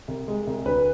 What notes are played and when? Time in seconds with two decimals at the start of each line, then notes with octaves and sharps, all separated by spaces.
0.08 C2
0.28 G#3
0.47 C2
0.65 D2 B4